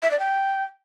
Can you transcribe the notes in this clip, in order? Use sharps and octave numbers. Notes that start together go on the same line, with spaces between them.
E5
D5
G5